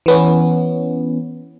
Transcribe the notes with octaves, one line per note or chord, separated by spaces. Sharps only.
E3 B3 C#4